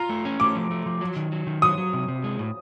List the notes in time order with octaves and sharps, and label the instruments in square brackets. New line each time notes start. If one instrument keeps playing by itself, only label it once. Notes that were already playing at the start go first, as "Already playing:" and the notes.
Already playing: [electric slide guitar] F4 [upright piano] A#5
[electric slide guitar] A3
C#4
[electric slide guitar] A3 [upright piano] D6
[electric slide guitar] F3
A3
F3
F#3
D#3
F#3
D#3
[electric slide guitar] F#3 [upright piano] D#6
[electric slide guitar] F#3
C3
C3
G#3
A2